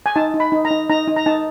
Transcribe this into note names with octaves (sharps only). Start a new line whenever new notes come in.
G#5
D#4 A5
D#4
B5
D#4
A#5
D#4
D#4 A#5
D#4
A#5
D#4 A5